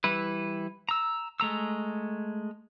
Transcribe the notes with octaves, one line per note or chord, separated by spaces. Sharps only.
E3 G3 E4 B4
A#5 E6
G#3 A3 A#5 E6